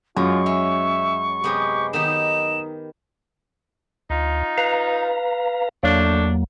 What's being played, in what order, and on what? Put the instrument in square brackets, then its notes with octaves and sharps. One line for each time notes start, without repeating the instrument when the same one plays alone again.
[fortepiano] F#2 [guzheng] G#3 [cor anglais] F4 [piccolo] C#6
[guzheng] C#4 [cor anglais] E5
[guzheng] C3 G#3 B3 [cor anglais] G4
[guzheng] D#3 B3 G4 [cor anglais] D#4 [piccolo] E7
[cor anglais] D#4
[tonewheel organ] D2 [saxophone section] D#4 F4
[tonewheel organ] B4 F5 A#5
[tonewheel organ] E2 F#3 A#3 [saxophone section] A3 D4